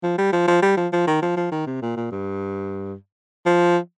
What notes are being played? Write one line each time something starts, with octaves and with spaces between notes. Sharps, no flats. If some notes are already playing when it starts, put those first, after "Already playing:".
F3
G3
F3
F3
G3
F3
F3
D#3
F3
F3
D#3
C3
A#2
A#2
G2
F3